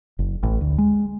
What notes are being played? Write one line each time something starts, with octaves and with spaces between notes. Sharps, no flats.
F#1
A1
D2
G#3